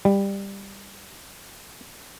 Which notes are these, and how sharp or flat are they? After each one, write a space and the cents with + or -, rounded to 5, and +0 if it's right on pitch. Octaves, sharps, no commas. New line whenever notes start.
G3 +15